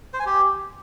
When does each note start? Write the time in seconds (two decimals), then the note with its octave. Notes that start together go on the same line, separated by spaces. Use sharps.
0.14 C5
0.20 G#5
0.26 G4